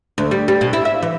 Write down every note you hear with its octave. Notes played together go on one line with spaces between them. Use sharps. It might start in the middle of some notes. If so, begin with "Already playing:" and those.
D2
G3
G3
B2
E4
E5
E3